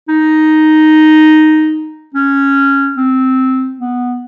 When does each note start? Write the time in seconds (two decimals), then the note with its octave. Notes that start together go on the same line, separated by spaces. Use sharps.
0.08 D#4
2.14 C#4
2.97 C4
3.79 B3